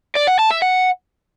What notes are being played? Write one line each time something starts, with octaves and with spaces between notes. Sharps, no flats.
D5
F#5
A5
E5
F#5